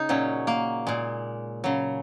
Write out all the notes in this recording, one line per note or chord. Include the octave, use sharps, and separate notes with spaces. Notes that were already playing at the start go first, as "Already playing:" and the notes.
Already playing: C#3 D#4 G#4
A#2 F#3 C#4
A#3
A#2 G#3
C#3 F#3